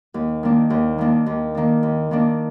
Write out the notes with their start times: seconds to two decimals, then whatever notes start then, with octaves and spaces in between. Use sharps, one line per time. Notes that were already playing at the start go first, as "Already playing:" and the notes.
0.14 D#2
0.43 D#3 A#3 D4
0.70 D#2
0.98 D#3 A#3 D4
1.26 D#2
1.55 D#3 A#3 D4
1.83 D#2
2.11 D#3 A#3 D4